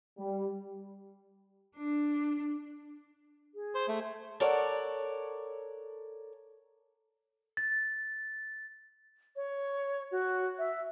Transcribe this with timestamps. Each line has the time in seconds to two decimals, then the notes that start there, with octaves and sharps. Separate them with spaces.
0.18 G3
1.77 D4
3.55 G#4
3.75 C5
3.88 A3
4.40 A4 A#4 C#5 D5 F#5
7.57 A6
9.36 C#5
10.12 F#4
10.59 E5